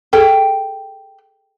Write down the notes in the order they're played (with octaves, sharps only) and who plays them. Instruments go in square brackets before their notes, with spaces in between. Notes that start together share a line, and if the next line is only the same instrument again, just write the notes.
[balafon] G#4 A4 [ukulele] G5